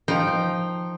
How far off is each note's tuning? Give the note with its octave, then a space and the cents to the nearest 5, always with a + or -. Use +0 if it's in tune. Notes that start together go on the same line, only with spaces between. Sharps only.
F3 +5 D#4 +0 G5 +0